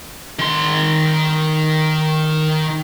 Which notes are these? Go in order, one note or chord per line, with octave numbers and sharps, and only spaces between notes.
D#3 C6